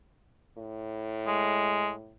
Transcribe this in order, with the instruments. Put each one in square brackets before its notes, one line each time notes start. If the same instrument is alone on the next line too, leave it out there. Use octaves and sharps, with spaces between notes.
[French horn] A2
[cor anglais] G#3